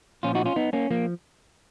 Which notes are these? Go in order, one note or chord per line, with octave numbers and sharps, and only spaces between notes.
A#2 F3 C#4 F4
D#4 F#4
C#4 F4
B3 D#4
A#3 C#4
F3 A#3